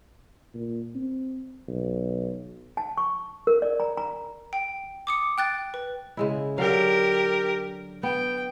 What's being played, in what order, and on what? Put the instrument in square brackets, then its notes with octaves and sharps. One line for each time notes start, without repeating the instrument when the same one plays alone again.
[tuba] A#2
C4
B1
[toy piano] A5
C#6
A#4
D5
A#5
A#5
[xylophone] G5
D6 D#6 C#7
G5 F#6 A6
B4
[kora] C#3 G#3 E4
[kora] D3 F#3 F5 [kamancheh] G4 A#4
[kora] B3 [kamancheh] G5